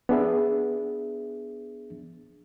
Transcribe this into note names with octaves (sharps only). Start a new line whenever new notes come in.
B3 D4 G#4 E5